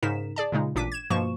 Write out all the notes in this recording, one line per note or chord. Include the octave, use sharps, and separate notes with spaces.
G#2 C#3 D#4 A#4 B6 E7
G#4 D5 A5
A#2 C#3 G#3 D#4
A1 A#2 D4 D6 B6 D#7
G#6 E7
G2 B2 F3 A#3 C#6 E7